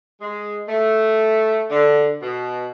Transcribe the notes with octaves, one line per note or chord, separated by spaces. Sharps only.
G#3
A3
D3
B2